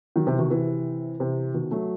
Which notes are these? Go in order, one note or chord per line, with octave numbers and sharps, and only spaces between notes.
D#3 F#3
C3 E3
B2 D#3
C3 E3
C3 E3
B2 D#3
F#3 A3